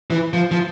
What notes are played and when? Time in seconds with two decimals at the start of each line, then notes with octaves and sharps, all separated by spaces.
0.10 E3
0.33 F3
0.52 F3